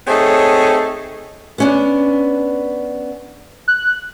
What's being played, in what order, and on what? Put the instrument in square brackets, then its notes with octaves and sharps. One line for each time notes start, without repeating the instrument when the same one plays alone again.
[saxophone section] A3 C4 D#4 G#4 A4 C#5
[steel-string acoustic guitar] B3 C#4 D4
[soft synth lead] F#6